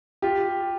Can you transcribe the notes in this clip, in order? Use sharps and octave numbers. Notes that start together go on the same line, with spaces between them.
F4 G4